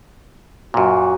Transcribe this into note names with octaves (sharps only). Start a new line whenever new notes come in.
F#2 A#2 F#4